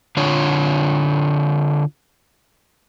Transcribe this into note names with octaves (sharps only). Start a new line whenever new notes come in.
D3 D4 F4 C#5